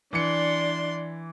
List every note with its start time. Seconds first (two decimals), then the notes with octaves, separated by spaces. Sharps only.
0.13 E3 D4 D5 C6 C#7